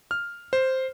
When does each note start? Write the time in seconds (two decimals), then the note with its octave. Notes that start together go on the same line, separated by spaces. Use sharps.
0.11 F6
0.53 C5